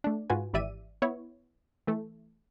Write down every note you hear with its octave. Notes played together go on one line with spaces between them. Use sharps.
A3 D4
G#2 F4 F#4 B4 G#5
G#1 E3 G4 D5 E5 D#7
B3 E4 C#5
E3 A3